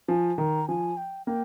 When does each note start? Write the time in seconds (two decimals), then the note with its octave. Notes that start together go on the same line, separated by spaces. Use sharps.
0.08 F3 G#5
0.38 D#3 A#5
0.68 F3 G#5
0.97 G5
1.27 A#3 G5